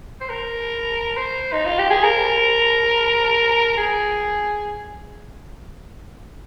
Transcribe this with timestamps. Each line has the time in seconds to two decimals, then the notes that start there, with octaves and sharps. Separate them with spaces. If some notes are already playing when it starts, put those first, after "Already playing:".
0.21 C5
0.29 A#4
1.17 C5
1.53 D#4
1.66 F4
1.79 G4
1.90 G#4
2.03 A#4
3.77 G#4